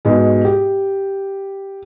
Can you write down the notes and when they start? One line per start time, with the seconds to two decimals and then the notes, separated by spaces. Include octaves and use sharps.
0.05 G#2 B2 G#3
0.45 G4